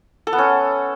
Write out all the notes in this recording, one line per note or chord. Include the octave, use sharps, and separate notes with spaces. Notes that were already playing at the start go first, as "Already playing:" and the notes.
A4
B3
C#4